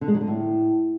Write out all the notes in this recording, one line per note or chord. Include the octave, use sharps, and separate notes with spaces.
D3
G#3
F#3
D3
A2